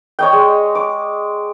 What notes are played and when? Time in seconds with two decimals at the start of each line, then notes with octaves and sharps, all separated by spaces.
0.19 C#5 D#5 G5
0.33 G#3
0.75 D6